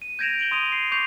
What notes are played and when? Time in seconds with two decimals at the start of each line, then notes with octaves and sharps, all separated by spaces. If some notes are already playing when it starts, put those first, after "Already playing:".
0.02 D#7
0.19 G6 G#6 A#6 D7 E7 F7
0.39 D7 F#7 G7
0.51 C6 D#6 D#7 F7
0.72 C7
0.92 C#6 D6 G6 C7 F7